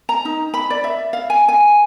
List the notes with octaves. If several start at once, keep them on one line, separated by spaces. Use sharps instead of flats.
A#5
D#4
B5
D5
E5
F5
G#5
G#5